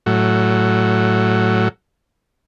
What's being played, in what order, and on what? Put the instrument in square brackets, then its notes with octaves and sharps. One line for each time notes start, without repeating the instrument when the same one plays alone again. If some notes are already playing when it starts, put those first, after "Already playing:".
[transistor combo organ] A2 F#3